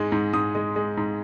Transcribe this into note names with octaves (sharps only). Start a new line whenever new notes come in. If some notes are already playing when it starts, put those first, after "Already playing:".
Already playing: G#2 G#3
G#2
G#2 D#6
G#3
G#3
G#2